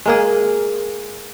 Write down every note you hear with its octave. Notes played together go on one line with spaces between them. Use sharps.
G#3 A#3 G#4